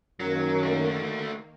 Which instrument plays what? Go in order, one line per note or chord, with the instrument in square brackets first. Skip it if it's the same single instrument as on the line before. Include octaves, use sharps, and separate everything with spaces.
[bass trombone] F#2 [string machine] D#3 A#3 [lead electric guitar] F#3
[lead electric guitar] A3 F#4